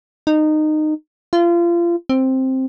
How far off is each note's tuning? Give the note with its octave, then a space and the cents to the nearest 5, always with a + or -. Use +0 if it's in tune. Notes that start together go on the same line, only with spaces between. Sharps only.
D#4 -20
F4 -30
C4 +5